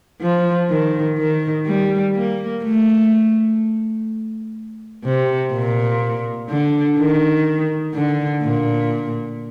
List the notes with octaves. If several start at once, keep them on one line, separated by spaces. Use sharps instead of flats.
F3
D#3
D#3
G3
A#3
A3
C3
A#2
D3
D#3
D3
A#2